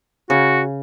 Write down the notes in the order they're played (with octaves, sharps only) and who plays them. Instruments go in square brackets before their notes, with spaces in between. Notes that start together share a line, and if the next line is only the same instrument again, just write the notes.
[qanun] C#3 [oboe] F#4